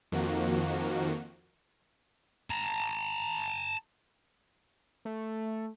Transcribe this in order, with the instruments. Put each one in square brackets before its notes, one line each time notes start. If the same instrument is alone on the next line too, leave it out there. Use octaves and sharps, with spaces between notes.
[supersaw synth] F2 D#3 F3 A#3 F#4
[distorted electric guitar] A5 A#5
[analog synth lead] A3